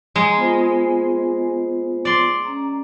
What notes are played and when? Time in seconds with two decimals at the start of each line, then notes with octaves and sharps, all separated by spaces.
0.16 G#3 A#5 C6
0.37 B3 F4 C5
2.05 D5 C6
2.45 C#4 A#5